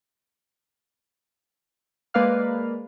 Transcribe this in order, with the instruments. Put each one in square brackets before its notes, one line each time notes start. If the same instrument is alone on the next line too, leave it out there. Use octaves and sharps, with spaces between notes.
[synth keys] G#3 A#3 B4 D5 F5 F6